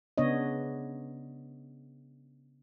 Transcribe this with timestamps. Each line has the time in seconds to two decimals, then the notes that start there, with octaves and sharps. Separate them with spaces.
0.18 C#3 B3 D4 C#5 D#5